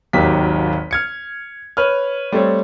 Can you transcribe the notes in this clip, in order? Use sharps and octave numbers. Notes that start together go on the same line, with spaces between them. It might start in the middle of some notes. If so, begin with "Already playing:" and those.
G#1 D#2 D#3 F#3 G4 B6
F6 G#6 C#7
B4 C#5 F6
G3 A3 C4 C#5